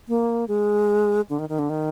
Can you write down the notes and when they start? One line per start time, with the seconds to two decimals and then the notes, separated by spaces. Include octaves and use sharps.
0.08 A#3
0.48 G#3
1.29 D3
1.39 D#3
1.49 D#3
1.59 D3
1.70 D#3